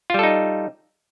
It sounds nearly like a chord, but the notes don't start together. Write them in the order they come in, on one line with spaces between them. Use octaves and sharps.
F4 G3 A4 D#4